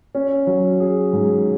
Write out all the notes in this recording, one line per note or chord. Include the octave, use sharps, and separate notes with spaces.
C#4
F#3
G#4
G#2